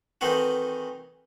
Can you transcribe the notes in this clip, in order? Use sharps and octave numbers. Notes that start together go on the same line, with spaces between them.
D#3 E3 A3 C4 D#4 F#4